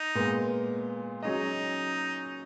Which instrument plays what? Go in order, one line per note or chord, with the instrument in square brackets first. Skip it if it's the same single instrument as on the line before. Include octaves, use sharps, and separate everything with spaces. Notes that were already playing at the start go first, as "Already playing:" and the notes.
Already playing: [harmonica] D#4
[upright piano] A#2 G#3 B3
[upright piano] F#3 C#4 G#4 D#5 [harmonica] D#4